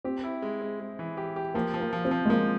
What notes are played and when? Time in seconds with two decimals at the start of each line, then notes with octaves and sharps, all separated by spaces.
0.05 C4 G4
0.24 E4
0.42 G#3
0.62 G#3
0.80 G#3
0.99 E3
1.17 G4
1.36 G4
1.54 F3 A#3
1.74 F3
1.81 A#3
1.93 F3
2.05 C4
2.11 F3
2.26 G#3
2.30 F3 A#3